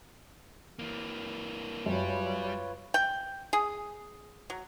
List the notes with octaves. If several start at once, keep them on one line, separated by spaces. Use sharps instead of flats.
E3 A#3
F#2 G3 F4 B4 C#5
G5
G#4
F#3